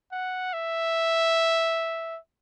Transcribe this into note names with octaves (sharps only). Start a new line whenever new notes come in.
F#5
E5